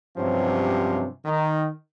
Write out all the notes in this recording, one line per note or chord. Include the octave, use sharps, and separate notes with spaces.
G2 C3 F3 F#3 C#4
D#3